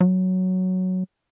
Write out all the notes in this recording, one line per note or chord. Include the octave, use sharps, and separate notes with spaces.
F#3